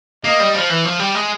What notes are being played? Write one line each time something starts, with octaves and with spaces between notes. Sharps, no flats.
A#3 D#5
G3
F3
E3
F3
G3
G#3